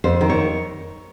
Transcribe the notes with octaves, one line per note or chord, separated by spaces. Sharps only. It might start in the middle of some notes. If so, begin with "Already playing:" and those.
F2 C5
D#3
C#5